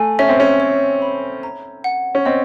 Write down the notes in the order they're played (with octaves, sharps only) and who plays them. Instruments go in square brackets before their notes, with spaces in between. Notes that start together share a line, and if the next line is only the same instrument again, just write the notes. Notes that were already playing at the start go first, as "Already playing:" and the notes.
Already playing: [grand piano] A3 [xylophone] G#5
[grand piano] C#4 [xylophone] E5
[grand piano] C4
C#4
[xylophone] C#5
B5
A#5
F#5
[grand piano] C#4
[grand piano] C4 [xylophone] D#5